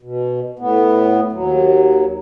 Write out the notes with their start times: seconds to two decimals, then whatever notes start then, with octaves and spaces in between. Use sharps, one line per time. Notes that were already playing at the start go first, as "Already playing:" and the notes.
0.03 B2
0.59 A2 B3
1.32 D#2 F#3